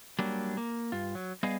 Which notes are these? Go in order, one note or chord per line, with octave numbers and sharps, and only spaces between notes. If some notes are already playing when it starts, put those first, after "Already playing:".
F#3 G3 A#3 D4
A#3
G2 F4
F#3
G3 B3 G#4 D#5 F5